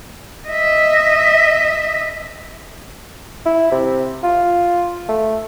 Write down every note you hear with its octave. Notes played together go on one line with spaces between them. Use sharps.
D#5 E5
E4
C3
F4
A3